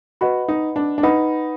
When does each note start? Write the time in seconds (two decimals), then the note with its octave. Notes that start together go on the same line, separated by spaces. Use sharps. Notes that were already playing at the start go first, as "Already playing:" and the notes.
0.21 F#4 B4 D#5 F#5 B5
0.48 D#4
0.76 D4
0.98 D4
1.03 D#4 B4 D#5 F#5 B5